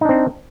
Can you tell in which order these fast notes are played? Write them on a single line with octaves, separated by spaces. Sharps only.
D#4 D4 C4